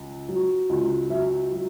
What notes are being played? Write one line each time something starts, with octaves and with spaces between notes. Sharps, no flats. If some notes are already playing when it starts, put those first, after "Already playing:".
Already playing: C#2
F#3
C#2
F#3 E5
F#3